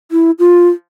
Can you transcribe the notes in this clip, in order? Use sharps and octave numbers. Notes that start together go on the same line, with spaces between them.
E4
F4